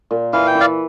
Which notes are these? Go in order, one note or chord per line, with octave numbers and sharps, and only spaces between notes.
A#2
E3 F5
G5
E3
D5 F5